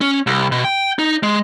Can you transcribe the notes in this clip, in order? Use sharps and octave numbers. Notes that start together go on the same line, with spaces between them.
C#4
C2
B2
G5
D#4
G#3